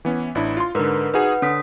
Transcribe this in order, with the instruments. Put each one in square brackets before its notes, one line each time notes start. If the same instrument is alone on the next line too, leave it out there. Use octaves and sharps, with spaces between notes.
[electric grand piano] E3 B3 C#4
A1 D4 E4
F4 C6
[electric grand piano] G#2 D3 [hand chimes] A#4 B4
[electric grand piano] D#4 F#4 G#4 [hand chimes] B4 F#5
[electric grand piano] D3 [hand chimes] C#4 D#6 B6